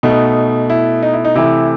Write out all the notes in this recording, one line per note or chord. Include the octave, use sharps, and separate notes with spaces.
B2 A3 D#4
E4
D#4
E4
D#4
C3 E3 A3 E4